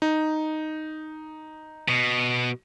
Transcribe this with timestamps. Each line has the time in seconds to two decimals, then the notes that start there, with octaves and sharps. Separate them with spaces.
0.02 D#4
1.88 B2